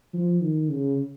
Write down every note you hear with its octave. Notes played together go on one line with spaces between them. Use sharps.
F3
D#3
C#3